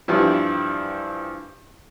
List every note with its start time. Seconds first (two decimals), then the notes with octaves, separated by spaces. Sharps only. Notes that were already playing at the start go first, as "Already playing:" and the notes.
0.08 G2 E3 F3 G3 E4